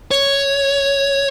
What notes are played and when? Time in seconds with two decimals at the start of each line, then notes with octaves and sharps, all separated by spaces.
0.11 C#5